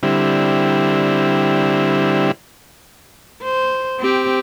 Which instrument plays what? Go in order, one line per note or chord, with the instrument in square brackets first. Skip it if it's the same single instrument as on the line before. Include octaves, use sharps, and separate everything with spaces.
[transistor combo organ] D3 G3 C4 E4
[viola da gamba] C5
C4 G4